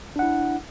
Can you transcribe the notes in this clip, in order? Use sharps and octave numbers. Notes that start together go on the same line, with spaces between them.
D4 E4 F#5